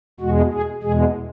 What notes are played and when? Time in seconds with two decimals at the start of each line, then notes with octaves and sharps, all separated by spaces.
0.20 E2 B2 G#3 F#4
0.52 G#4
0.82 E2 B2 G#3 G#4